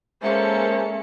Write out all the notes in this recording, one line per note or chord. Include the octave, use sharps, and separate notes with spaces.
G#3 A#3 C#4 A4 C5 E5 C#7